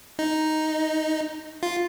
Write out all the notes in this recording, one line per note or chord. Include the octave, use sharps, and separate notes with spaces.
D#4
F4